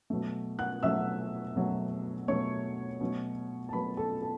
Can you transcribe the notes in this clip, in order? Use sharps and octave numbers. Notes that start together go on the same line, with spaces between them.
B2 F#3 A3
F#5 F#6
B2 F#3 A3 E5 E6
B2 F#3 A3
B2 F#3 A3 C#5 C#6
B2 F#3 A3
A5
B2 F#3 A3 B4 B5
A4 A5
A4 A5